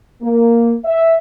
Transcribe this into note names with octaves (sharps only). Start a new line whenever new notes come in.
A#3
E5